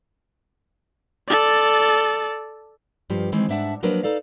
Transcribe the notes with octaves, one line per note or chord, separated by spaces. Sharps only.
A4 D5
G2 F3 G4
D#3 E3 G#3 C4
G#2 D4 E5 F#5 A5
F3 F#3 A#3 D4 A#4 B4
D#4 A4 D5 F5